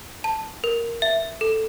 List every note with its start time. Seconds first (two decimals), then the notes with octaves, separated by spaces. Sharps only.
0.24 A5
0.64 A#4
1.02 E5
1.41 A4